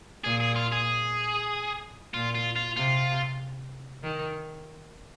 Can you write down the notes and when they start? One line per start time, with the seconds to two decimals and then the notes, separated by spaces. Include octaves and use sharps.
0.24 A#2 G#4
0.40 G#4
0.56 F4
0.72 G#4
2.14 A#2 F4
2.35 F4
2.56 F4
2.76 C3 F4
4.03 D#3